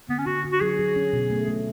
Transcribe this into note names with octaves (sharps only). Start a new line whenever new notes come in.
D3 B3
C#4
D3 F#4
D3
F#4
F#3 G#4
F#3
C#4
B2
A3
A3